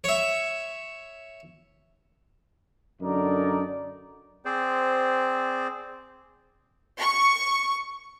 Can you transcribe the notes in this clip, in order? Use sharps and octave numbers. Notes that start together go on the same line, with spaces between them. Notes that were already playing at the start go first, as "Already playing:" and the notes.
C#5 E5
F#2 D3 D#4 A#4 D5
C4 G#4 C5 D5
C#6